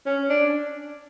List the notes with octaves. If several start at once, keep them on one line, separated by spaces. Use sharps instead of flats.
C#4
D4